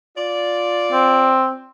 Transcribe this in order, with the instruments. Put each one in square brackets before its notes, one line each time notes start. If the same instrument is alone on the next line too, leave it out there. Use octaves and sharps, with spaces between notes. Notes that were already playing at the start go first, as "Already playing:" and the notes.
[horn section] F4 D5
[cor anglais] C4